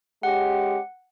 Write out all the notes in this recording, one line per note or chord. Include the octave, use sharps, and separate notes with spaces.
G#3 C#4 G4 F#5